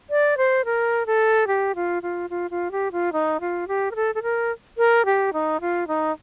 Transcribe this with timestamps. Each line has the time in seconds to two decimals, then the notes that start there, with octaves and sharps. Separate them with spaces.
0.10 D5
0.37 C5
0.65 A#4
1.06 A4
1.47 G4
1.75 F4
2.03 F4
2.30 F4
2.51 F4
2.72 G4
2.92 F4
3.13 D#4
3.40 F4
3.68 G4
3.91 A#4
3.96 A4
4.15 A4
4.23 A#4
4.78 A#4
5.05 G4
5.33 D#4
5.61 F4
5.88 D#4